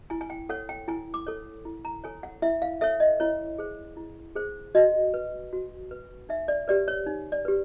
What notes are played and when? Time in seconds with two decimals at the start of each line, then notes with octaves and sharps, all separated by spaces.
0.10 E4 G#5
0.21 G#5
0.30 G5
0.49 A4 C#5 F#5
0.69 G5
0.88 E4 G#5
1.14 D6
1.27 A4 C#5
1.65 E4
1.85 A#5
2.04 A4 C#5 G#5
2.23 F#5
2.42 E4 E5
2.62 F5
2.81 A4 C#5 E5
3.00 D#5
3.20 E4 C#5
3.58 G#4 C5
3.97 E4
4.35 G#4 C5
4.75 F#4 D#5
5.14 B4
5.53 F#4
5.91 B4
6.29 D#4 E5
6.48 D5
6.68 G4 B4 D5
6.88 C#5
7.06 D#4
7.32 D5
7.45 G4 B4